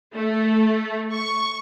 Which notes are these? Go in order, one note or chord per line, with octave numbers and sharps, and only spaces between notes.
A3
C#6